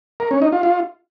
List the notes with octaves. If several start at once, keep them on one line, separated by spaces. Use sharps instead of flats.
A#4
C#4
D#4
F4
F4